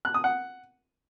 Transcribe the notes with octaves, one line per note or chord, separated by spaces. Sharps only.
F#6
D#6
F#5